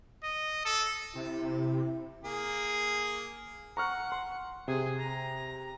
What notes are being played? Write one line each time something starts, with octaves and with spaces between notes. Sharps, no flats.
D#5
A4
C3 E4
A#3 G#4
F#5 A#5 C#6 F6
C6
C3 G#4
A#5